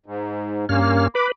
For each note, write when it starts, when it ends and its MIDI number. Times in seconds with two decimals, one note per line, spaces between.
0.06 0.65 44
0.69 1.08 43
0.69 1.06 58
0.69 1.08 61
0.69 1.08 89
1.15 1.32 71
1.15 1.27 83
1.15 1.27 86